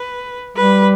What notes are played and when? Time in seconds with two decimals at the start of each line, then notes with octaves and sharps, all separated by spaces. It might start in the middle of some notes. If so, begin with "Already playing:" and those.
Already playing: B4
0.57 G3 B4